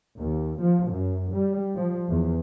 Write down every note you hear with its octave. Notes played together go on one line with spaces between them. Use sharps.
D#2
F3
F#2
G3
F3
E2